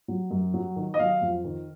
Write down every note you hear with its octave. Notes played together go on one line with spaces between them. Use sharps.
F#3
F#2
F#3
D#3
D#5
F#3 F5
F2
D#3